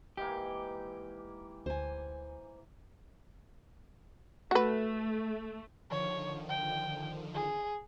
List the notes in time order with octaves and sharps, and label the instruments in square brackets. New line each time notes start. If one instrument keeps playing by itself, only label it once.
[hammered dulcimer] G#2 E3 A#3 [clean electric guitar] G4
[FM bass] D2 [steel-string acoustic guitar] C5 G#5
[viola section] A3 [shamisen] F#4 B4
[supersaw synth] D3 D#3 F3 [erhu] C#5
[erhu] G5
G#4